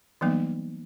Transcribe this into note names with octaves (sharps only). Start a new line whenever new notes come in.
E3 F#3 G3 A#3 B3 D#4